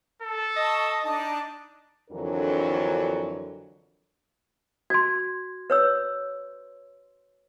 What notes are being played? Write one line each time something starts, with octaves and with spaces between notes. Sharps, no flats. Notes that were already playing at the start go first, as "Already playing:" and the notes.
A4
D#5 A5 C#6
D4 D#4 A5
F2 D3 E3 F#3 D4 A#4
F#4 C6 G#6
B4 C#5 E6